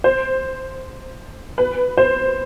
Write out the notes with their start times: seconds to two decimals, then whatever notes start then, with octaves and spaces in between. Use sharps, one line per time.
0.04 C5
1.58 B4
1.97 C5